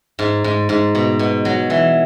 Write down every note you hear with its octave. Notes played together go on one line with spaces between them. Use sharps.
G#2
G#2
G#2
B2
B2
F#3
E3